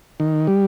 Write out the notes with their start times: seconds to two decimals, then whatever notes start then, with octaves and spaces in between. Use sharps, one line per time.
0.20 D#3
0.47 G3